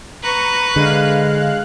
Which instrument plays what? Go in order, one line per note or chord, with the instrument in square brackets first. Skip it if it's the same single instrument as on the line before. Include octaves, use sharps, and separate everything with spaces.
[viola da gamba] B4 [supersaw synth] A#5 C#6
[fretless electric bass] D3 [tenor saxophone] G#3 [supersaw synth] F5 F#6